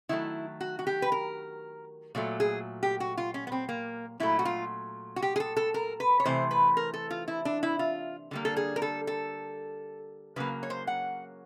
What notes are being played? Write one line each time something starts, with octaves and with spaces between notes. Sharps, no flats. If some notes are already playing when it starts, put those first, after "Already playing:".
D#3 F#3 A3 E4
F#4
F#4
G4
B4
A#4
A#2 F#3 A3
G#4
G4
F#4
F4
C#4
B3
C4
A#3
A#2 F#3 A3 E4
F#4
F4
F#4
G4
G#4
A4
A4
A#4
B4
C#5
C3 E3 A3 C5
B4
A#4
A4
F4
E4
D4
E4
F4
D3 G3 A#3
A4
G#4
A#4
A4
A4
C#3 F#3 A#3 B4
C#5
C5
F#5